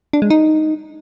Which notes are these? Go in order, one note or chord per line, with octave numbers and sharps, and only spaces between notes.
D4
G#3
D#4